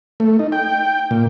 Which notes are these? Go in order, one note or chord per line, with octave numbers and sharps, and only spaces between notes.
A3
D#4
G5
A#2